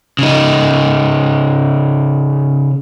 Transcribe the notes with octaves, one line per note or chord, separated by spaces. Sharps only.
C#3 D#4